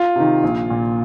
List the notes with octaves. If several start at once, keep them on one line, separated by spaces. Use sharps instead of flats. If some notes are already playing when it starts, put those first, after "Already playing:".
Already playing: F4
C3 D#3
A#1
A#2